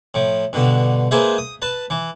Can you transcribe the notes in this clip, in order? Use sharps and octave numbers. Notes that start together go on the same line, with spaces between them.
A2 F3
G2 B2 D3
G#3 A#3 G#4 B4 C5 E5
D#6
B4 A5
E3